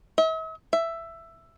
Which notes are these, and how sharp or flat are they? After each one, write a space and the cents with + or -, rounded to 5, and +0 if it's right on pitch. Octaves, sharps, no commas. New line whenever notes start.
E5 -45
E5 +10